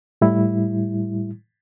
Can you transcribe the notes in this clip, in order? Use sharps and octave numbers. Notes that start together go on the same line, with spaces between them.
A2 G3 E4